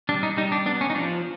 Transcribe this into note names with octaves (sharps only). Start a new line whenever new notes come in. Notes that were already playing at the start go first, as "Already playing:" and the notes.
G3 D4
D#4
G3 D#4
D4
B3 D4
C#4
D#4
F3 D4